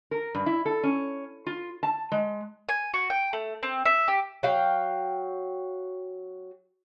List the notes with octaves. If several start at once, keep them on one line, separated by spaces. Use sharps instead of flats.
A#4
G2
E4
A4
C#4
F4
A5
G#3
G#5
F#4
G5
A3
C4
E5
G4
F#3 F5 G5